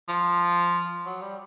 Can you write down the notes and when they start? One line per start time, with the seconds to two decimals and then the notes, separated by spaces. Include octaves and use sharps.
0.09 F3
1.06 F#3
1.22 G3